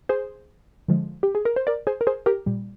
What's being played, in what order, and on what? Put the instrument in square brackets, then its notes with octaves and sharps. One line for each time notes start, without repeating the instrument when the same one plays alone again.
[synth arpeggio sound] G#4 C5
D3 F3 G#3
G4
G#4
A#4
C5
A#4 D5
G#4 C5
A#4
G#4 C5
G4 A#4
A#2 G3